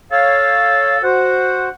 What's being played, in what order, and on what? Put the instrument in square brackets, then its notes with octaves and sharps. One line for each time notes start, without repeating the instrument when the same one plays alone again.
[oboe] A4 [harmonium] C#5 F5
[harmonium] F#4 C5 [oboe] F#5